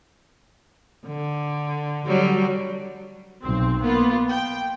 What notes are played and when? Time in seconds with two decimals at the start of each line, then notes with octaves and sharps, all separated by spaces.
1.07 D3
2.07 D3 F#3 G3
3.43 B1 C4
3.80 A#3 B3 F4
4.30 G5